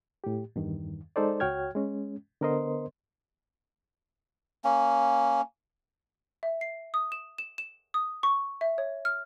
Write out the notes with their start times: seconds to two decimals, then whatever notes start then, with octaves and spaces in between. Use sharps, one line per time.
0.24 A2 G4
0.56 E2 G2 D#3
1.16 G#3 D#4 A4 C5 D5
1.40 C#2 F#4 C#5 G5 F6 G#6
1.75 G#3 C#4
2.41 D3 B3 A#4 C5 D#5 C6
4.64 A#3 C#4
6.43 E5
6.61 C7
6.94 D#6
7.12 E7
7.38 E7
7.58 E7
7.94 D#6
8.23 C#6
8.61 E5
8.78 C#5
9.05 F6